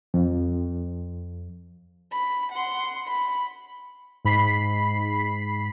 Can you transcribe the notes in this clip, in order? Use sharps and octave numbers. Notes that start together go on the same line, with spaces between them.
F2
B5
F#5 C6
B5
G#2 B5 B6 C7